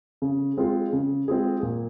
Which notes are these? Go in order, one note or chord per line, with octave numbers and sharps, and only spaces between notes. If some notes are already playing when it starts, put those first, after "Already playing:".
C#3
G#3 C4 F4 G#4
C#3
G#3 C4 F4 G#4
A#2